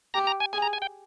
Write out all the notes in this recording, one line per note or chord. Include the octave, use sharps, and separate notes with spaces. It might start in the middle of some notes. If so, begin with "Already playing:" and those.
G4 A#5
A#5
G#5
G#4 G#5
A#5
G#5
G5